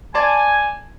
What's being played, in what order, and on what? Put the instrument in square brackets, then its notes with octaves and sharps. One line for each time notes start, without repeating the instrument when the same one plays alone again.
[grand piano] D5 A5 C6 [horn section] G#5